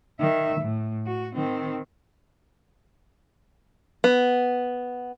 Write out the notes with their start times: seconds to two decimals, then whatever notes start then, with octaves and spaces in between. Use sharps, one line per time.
0.20 D#3 E5
0.61 A2
1.07 F#4
1.36 D#3 C4
4.04 B3